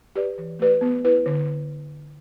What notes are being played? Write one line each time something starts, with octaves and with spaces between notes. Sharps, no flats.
G4 B4 D5
E3
A3 G4 B4 D5
B3
E4 B4
D3